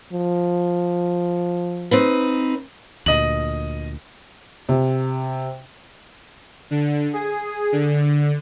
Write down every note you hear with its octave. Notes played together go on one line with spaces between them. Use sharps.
F3
C4 D#4 B4
D2 A#2 D#5 F#7
C3
D3
G#4
D3